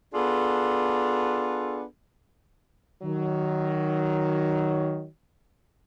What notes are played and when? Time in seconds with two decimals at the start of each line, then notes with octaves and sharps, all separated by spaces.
0.14 B3 D4 F4 G#4 A4
3.03 D#3 F#3